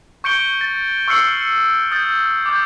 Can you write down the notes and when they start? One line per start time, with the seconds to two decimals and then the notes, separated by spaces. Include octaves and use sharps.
0.24 C#6 G6 C#7 D7 G7
0.61 A6
1.08 C#6 E6 F6 C7 C#7 F#7
1.39 C#7
1.91 D#6 G6 A6
2.46 D6 G6